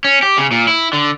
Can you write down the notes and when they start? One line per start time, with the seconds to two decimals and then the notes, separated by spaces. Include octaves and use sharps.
0.04 C#4
0.23 G4
0.38 C#3
0.51 A#2
0.67 E4
0.93 D3